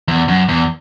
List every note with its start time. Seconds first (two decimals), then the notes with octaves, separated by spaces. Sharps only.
0.08 E2
0.28 F#2
0.48 E2